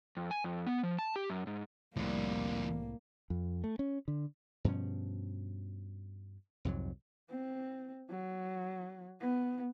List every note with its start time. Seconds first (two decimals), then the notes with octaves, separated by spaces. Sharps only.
0.17 F2
0.31 G#5
0.44 F2
0.67 B3
0.83 F3
0.99 A5
1.16 G4
1.30 F#2
1.47 G#2
1.97 C2 F2 A2 D3 G3 A#3
3.30 F2
3.64 A3
3.79 C#4
4.08 D3
4.65 G2 B2 F3 C#4
6.65 C2 F2 G#2 F#3
7.30 C4
8.10 F#3
9.21 B3